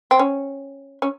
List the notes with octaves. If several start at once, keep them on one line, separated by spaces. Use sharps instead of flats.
C4
C#4
C#4